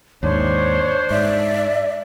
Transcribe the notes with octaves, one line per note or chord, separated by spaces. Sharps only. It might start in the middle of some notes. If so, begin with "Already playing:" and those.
D#2 G#2 D4 C5 C#5
G#2 D5 E5